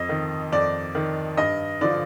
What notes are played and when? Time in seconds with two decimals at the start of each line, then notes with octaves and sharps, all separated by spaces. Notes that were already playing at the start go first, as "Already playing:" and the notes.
Already playing: F2 D#5
0.09 D#3
0.52 F2 D5
0.95 D#3
1.37 G2 D#5
1.81 D3 F3 D5